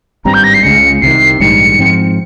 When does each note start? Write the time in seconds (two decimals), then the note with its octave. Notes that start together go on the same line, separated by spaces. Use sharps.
0.25 G#1 G2 G3 C4 A#5
0.34 G6
0.44 A#6
0.54 C7
0.63 C#2 C#3 G#3 C#7
1.02 C2 C3 D#3 C7
1.40 A#1 G#2 D#3 G3 C#7
1.79 G#2 F3 C4